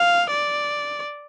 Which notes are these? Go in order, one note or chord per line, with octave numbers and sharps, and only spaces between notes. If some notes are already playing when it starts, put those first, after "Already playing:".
Already playing: F5
D5